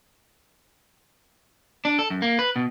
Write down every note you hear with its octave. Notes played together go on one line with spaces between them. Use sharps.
D4
A4
F#2
A#3
B4
B2